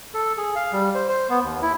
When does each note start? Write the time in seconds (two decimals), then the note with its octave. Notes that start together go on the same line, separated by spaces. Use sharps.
0.14 A4
0.37 G#4
0.55 F5
0.73 G3
0.95 C5
1.09 C5
1.30 B3
1.43 D#2
1.62 E4